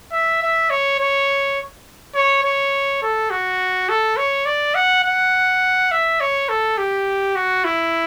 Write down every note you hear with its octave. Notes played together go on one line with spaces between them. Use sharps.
E5
E5
C#5
C#5
C#5
C#5
A4
F#4
A4
C#5
D5
F#5
F#5
E5
C#5
A4
G4
F#4
E4